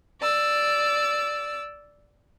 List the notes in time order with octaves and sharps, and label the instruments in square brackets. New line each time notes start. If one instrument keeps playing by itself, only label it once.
[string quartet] D5 E6